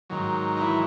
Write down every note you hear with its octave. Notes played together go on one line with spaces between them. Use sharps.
G#2 D#3 F#3
D#4
E3 E4